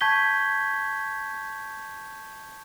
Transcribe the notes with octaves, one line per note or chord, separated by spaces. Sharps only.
A5 C#6 G6 G#6 B6 G7